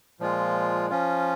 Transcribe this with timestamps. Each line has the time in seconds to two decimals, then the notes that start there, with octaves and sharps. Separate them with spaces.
0.20 A#2 F3 G#3 F4
0.90 F3 C#4 F4